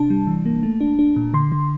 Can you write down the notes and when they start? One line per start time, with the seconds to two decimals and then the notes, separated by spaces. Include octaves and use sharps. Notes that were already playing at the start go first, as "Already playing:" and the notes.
Already playing: C3 D4 A5
0.10 G3
0.27 E3
0.46 A#3
0.63 A3
0.81 D4
0.99 D4
1.16 A#2
1.34 D3 C6
1.52 D3